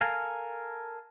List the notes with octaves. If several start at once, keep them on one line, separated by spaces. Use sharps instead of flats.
A4 A#4 F5 G#5